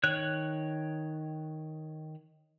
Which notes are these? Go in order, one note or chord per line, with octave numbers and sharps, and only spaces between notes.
D#3 C#5 F#6